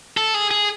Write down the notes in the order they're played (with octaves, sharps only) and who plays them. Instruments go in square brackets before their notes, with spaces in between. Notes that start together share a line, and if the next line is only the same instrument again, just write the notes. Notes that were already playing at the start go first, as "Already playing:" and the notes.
[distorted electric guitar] A4
G#4
G#4